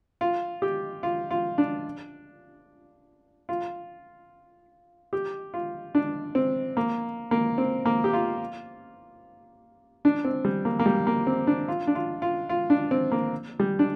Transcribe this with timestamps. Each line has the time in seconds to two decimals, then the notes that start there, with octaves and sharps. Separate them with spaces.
0.21 F4
0.62 G4
1.03 F4
1.31 F4
1.58 D4
3.49 F4
5.13 G4
5.54 F4
5.95 D4
6.35 C4
6.77 A#3
7.31 A#3
7.58 C4
7.85 A#3
8.04 G4
8.13 F4
10.05 D4
10.25 C4
10.45 G3
10.65 A#3
10.79 A#3
10.86 G3
11.07 A#3
11.27 C4
11.47 D4
11.68 F4
11.87 D4
11.95 F4
12.22 F4
12.49 F4
12.70 D4
12.91 C4
13.12 A#3
13.60 G3
13.79 D4